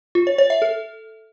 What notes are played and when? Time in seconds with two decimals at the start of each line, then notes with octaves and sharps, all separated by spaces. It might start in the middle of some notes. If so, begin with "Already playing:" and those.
0.15 F4
0.27 C#5
0.38 C#5
0.50 E5
0.62 A4